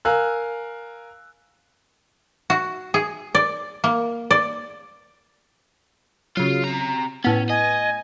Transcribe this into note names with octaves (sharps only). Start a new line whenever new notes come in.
A#4 F5 G#5 E6 F#6
F#4
G#4
D5
A#3
D5
C#3 F#3 F4
C3 A#5
A2 B3 C#4
D#5 G#5